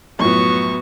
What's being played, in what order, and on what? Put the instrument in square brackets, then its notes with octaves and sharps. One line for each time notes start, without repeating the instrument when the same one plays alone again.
[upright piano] F#2 A2 F3 [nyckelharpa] B3 F#4 [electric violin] C#6